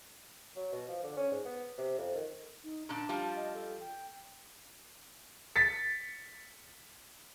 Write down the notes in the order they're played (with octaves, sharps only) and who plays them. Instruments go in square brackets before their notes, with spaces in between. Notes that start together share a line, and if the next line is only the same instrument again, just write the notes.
[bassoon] F#3
B2
F3
D3
C#4
G#2
B3
C3
F2
D#3
[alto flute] D#4
[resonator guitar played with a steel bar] A#2 D4 [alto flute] A5
[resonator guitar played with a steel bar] F3 G3 F4
[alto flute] D#5
A4
G5
[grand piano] A6 B6 C#7